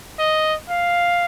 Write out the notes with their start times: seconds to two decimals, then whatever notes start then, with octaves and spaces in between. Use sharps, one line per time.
0.19 D#5
0.70 F5